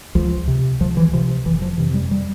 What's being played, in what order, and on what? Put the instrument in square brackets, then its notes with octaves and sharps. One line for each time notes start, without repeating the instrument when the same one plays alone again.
[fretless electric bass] C#2 F3
C3
C#2 F3
E3
C3 F3
F1 E3
F3
F2 C3 E3
G3
G3